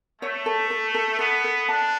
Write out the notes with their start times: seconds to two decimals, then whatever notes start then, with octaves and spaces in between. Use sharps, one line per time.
0.22 A3 C#5
0.46 A4
0.70 A4
0.94 A4
1.19 B3 A4
1.44 A4
1.68 D4 A5